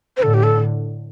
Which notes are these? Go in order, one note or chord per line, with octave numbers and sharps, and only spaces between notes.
C5
A2 D3 A4
G4
A4